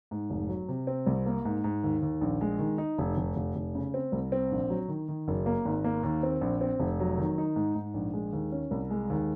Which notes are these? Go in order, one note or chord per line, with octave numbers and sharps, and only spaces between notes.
G#2
F1
F#3
C3
C4
C2
A#3
G#2
G#2
D#2
D#2
A#1
G#3
D#3
D#4
F1
F1
F1
F1
C#3
C4
C2
C4
A#1
F#3
D#3
D#3
F#1
A#3
G#1
A#3
D#2
C4
A#1
C4
F1
F#3
D#3
D#4
G#2
G#2
A#1
G#3
D#2
C#4
C2
G#3
D#2